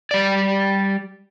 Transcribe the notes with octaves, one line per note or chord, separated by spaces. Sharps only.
G3 D5